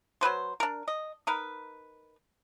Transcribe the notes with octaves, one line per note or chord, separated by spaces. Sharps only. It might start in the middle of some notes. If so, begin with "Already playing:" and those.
F#3 C4 B4 C5
D4 A#4
D#5
D#4 A#4 B4